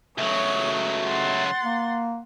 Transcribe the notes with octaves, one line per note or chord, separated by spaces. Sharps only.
C#2 F#3 A3 C#5 D#6
F#5 C6 A6
A#3